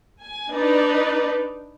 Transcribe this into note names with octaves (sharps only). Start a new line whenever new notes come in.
G#5
D4 D#4 B4 D5